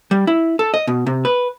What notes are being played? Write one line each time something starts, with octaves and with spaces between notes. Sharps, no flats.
G3
E4
A4
D#5
B2
C3
B4